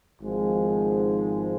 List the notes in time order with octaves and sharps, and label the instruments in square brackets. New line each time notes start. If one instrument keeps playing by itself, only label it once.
[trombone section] G#1 G#2 F3 G#3